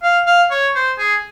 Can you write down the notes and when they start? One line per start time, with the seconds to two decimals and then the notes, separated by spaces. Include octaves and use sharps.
0.03 F5
0.26 F5
0.51 C#5
0.75 C5
0.98 G#4